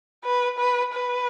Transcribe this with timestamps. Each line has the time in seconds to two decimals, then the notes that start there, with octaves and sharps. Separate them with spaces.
0.24 B4
0.58 B4
0.93 B4